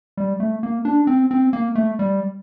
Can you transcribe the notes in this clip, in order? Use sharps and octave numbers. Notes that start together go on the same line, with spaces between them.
G3
A3
A#3
D4
C4
C4
A#3
A3
G3